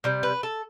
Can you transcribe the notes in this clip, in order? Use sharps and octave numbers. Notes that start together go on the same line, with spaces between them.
C3 G3
B4
A4